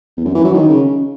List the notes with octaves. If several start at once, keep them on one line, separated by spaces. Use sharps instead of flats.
E2
F#2
E3
F#3
D#3
C#3